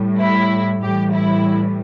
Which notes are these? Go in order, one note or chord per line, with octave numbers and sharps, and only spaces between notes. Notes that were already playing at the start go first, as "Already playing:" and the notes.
Already playing: A2 G3
E4
A2 E3 G3 G4
E4